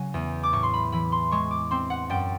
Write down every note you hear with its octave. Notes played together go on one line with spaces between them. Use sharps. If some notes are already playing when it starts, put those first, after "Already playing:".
Already playing: C#3 F#3 G#5
E2
D6
A2 C#6
C6
B5
E3 B5
C6
G#3 C#6
D6
C4 C6
F#5
F#2 G5